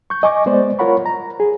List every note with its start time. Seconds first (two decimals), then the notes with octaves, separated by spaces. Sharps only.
0.10 C#6 G6
0.23 D#5 G#5 C#6 D6
0.46 G#3 B3 C5 D5
0.79 F4 A#4 C#5 F#5 B5 C#6
1.06 A#5
1.40 G#4